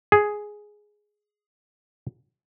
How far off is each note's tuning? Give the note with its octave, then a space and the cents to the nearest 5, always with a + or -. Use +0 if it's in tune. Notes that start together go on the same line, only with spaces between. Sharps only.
G#4 +5